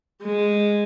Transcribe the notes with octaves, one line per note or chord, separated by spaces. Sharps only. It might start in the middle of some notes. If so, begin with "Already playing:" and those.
G#3